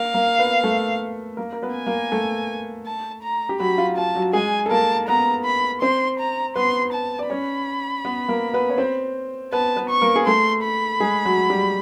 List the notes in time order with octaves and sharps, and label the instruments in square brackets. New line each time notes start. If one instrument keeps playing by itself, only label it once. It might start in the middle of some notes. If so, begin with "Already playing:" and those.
Already playing: [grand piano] A#3 A#4 [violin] F5
[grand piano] A#3 A#4
B3 B4
A3 A4
A#3 A#4
A#4
B3 B4
[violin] G#5
[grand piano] A#3 A#4
A3 A4
[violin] A5
A#5
[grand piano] G4
[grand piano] F#3 F#4 [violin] B5
[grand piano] F4
[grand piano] F4 [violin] A5
[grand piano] F#3 F#4
[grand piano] G#3 G#4 [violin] G#5
[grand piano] A4
[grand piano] A#3 A#4 [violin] A5
[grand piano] B3 B4 [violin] A#5
[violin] B5
[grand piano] C4 C5 [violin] C6
[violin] A#5
[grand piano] B3 B4 [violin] C6
[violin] A5
[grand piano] D5
[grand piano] C#4 C#5 [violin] B5
[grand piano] B3 B4
A#3 A#4
B3 B4
C#5
C4 C5
[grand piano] B3 B4 [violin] A5
[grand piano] B3 B4
[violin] C#6
[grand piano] A#3 A#4
G#4
[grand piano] A3 A4 [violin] C6
[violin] B5
[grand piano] G#3 G#4
F#3 F#4
G3 G4